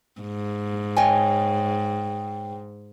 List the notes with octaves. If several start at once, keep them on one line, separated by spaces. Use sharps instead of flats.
G#2
C#5 D#5 G5 G#5